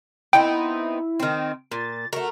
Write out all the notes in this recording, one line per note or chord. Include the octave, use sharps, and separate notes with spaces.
B3 C4 D#4 E4 G5
D#3 C4
A#2 A6
A3 F#4 A#4